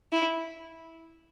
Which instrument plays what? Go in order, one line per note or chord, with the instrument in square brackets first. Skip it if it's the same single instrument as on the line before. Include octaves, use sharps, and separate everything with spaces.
[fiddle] E4